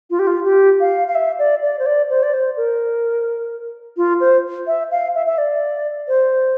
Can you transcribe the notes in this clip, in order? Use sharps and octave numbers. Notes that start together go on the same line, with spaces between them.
F4
G4
F4
G4
F5
F5
E5
D5
D5
C5
D5
C5
D5
C5
A#4
F4
C5
E5
F5
E5
E5
D5
C5